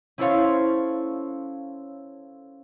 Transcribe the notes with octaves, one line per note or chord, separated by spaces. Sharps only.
C#4 E4 A4 C5 C#5 F5